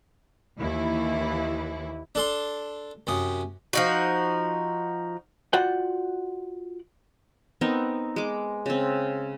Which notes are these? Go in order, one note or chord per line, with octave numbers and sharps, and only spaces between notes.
D#2 E3 E4
D4 A4 C6
F#2 C3 D#6
F3 D#4 F#4
F4 F#4 D5 F#5 G5
B3 C4 D#4 A#4
G#3 D6
C#3 C4